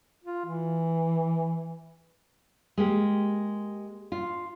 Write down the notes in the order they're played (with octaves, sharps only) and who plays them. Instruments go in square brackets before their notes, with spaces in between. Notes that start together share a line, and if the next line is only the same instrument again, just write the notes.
[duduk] F4
E3
[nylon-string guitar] G#3 A#3 G4
F4